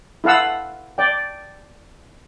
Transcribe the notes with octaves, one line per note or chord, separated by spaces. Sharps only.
E4 A4 F5 F#5 E6
D5 G5